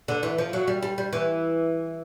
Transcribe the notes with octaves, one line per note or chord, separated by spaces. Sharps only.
D3
E3
F3
F#3
G3
G3
G3
E3